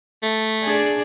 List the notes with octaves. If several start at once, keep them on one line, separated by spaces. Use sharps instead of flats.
A3
D4 G#4 D5